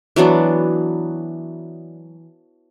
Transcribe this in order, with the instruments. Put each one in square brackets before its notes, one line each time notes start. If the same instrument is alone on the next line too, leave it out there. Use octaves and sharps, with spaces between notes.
[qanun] E3 F#3 B3 D4